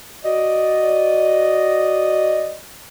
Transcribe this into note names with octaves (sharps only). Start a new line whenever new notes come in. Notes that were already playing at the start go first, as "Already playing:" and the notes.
F#4 D5 D#5